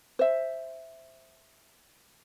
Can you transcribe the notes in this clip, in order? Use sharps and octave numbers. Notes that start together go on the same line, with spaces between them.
C5 E5